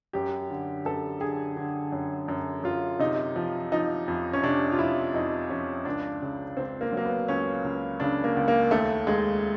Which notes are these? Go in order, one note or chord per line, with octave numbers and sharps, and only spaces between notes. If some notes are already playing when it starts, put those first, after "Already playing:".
F#2 G4
D3
F#2 A4
D3 G#4
D3
F#2
F#2
F#2 F4
C3 D#4
F3
F3 D#4
F2
C#4
C3 D4
F4
F2 E4
F2 D#4
F3 C#4
C#2 D4
C#3
C#2 C4
A#3
F#3 A#3
B3
C#2 C#4
C#2
C#3 D4
A#3
C#2
A#3
D#2 A3
D#2 G#3